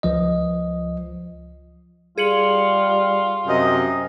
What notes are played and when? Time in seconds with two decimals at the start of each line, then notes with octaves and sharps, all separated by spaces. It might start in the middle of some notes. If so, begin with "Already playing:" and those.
0.03 C#2 F3 D#5
2.18 G3 F4 G#4 C#7 F#7
3.48 F#2 C3 D#5